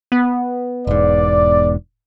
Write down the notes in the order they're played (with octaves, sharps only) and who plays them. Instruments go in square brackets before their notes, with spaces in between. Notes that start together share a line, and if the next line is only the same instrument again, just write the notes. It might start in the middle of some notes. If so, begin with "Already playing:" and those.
[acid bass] B3
[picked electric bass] E1 G#2 [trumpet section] D5